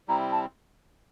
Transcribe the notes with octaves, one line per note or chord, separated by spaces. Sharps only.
C3 G3 C4 E4 A#5
A5